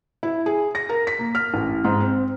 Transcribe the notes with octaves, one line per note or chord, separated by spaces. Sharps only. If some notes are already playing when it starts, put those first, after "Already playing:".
E4
G#4
A#6
A#4
B6
A#3
F6
A1
G#2
C4